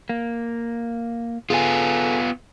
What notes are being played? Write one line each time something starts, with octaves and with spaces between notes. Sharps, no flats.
A#3
B3 F4 G#4 A4 G#5